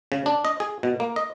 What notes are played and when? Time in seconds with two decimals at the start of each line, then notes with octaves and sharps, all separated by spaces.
0.12 C#3
0.26 D4
0.45 D#5
0.60 G#4
0.83 B2
1.00 A#3
1.16 D#5